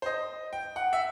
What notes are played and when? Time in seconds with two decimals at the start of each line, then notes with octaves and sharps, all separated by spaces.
0.02 C5
0.06 D#5
0.53 G5
0.76 F#5
0.93 E5